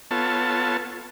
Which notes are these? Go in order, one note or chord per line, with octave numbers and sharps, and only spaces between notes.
B3 F4 A4 C#5 A5